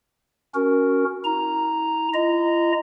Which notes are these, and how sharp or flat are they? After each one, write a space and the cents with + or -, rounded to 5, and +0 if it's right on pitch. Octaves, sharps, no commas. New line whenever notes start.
C#4 +0 F#4 +0 A#4 +0
E4 -40 A#5 +0
F4 -40 D#5 -10 A#5 +0